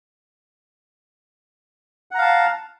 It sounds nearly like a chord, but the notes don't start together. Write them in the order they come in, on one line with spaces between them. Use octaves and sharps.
F#5 A#5 F5 A5